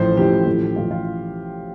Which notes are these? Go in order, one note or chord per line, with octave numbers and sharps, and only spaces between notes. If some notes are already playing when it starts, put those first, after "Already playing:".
Already playing: A1 A2 F3 A3 C5
A1 A2 F3 A3 G4
A1 A2 F3 A3
A1 A2 F3 A3 F4
F4